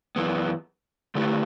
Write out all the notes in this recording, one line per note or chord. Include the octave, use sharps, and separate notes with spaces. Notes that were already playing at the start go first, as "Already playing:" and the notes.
F#2 E3 B3
D3 A3 E4 G4 B4